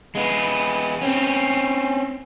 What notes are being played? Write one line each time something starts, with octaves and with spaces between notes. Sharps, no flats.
G#3 B3
C4 C#4